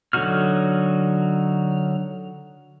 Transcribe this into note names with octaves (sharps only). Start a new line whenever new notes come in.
D3 F#3 D#4 F#4 F6